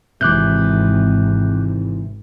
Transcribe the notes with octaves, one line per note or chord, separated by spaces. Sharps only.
G#1 G#2 C3 E3 D6 F#6 G6